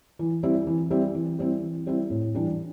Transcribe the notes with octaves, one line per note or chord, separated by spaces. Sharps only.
E3
G3 C4 E4
E3
G3 C4 E4
E3
G3 C4 E4
E3
G3 C4 E4
A2
E3 G3 D4 G4